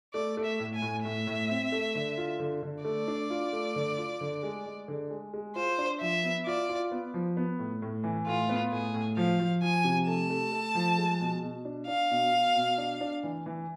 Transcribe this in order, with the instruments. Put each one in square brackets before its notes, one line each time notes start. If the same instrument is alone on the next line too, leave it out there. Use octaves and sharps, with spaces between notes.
[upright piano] A3 [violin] D5
[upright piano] A3
[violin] E5
[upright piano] A2
[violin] G#5
[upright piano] A2
[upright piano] A2 [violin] E5
[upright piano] A2
C4
A3
D3
F4
D3
D3
[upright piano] A3 [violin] D5
[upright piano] D4
F4
A3
D3
F4
D3
G#3
G#3
D3
G#3
G#3
[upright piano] F4 [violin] C5
[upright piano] D4
[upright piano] F3 [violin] E5
[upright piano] B3
[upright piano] F4 [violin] D5
[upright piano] F4
B3
F3
B3
A2
A2
E3
[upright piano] A2 [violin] F4
[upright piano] B3
[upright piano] A2 [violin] G#4
[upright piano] A2
[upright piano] F3 [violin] F5
[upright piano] F3
[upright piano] F3 [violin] G#5
[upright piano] C3
[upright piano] A3 [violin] A5
[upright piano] A3
A3
F3
G#3
B2
B2
D4
[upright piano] D4 [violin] F5
[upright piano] B2
B2
B2
D4
D4
E3
E3